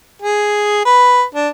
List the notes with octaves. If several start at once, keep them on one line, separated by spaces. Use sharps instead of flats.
G#4
B4
D4